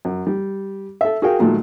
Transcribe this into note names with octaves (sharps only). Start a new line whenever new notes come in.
F#2
G3
A4 E5
F#4 G#4 A#4 F5 G5
A#2 D#3 F#3 G#3 A3